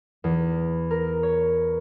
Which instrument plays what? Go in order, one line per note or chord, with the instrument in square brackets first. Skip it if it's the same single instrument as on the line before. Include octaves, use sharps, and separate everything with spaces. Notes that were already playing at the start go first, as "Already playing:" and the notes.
[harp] E2
A#4
C#5